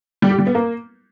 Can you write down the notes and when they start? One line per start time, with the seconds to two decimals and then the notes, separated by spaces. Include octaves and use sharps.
0.22 G3
0.30 G4
0.39 G3
0.47 B3
0.55 A#3